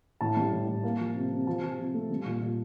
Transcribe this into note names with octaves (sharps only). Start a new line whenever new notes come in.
A2 A5
G3
A2
A2
A#3
F3
C3
C3
F3 A5
F3
C3
A3
G3
A#2
A#2